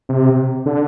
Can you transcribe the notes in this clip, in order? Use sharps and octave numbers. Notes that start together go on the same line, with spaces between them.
C3
D3